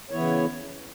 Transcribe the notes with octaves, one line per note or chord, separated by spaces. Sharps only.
C#3 E3 B3 E4 C#5